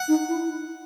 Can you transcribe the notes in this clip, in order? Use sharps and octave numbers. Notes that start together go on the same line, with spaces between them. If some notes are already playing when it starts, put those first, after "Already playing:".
Already playing: F#5
D#4
E4